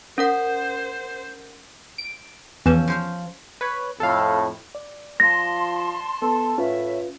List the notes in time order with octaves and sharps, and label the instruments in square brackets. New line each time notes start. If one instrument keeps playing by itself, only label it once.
[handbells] C#4 A#4 F#5 [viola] C5
[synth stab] D7
[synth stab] E2 E6 [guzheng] F3 C#4
[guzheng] F3 C5 F5
[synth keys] B4 C#5
[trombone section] F2 A2 [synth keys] A4 F5
[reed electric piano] D5
[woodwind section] F3 [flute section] A5 C6 [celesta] A#6
[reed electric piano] B3 [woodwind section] A4
[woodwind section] A2 [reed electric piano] C#4 F4 B4 [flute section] E5